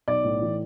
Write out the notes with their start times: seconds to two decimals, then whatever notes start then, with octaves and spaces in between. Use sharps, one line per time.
0.08 B1 D5
0.24 A2
0.42 E3